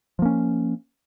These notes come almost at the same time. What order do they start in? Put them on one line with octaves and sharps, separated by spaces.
F3 A#3 C#4